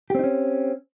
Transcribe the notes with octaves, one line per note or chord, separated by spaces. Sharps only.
C4 C#4 D#4 G4